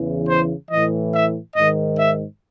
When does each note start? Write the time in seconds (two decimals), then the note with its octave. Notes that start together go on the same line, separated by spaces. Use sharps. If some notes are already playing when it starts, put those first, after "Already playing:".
Already playing: E2 C#3 E3
0.28 C5
0.71 A2 E3 D#5
1.13 E5
1.56 G#2 D#3 D#5
1.99 E5